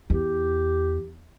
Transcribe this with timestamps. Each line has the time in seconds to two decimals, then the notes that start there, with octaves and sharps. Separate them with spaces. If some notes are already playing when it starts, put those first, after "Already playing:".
0.10 E2 G4